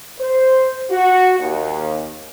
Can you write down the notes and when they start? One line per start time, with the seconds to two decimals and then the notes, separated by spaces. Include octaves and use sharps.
0.19 C5
0.90 F#4
1.39 D#2